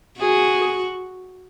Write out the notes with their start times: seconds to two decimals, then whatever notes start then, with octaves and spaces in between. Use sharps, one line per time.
0.20 F#4 G#4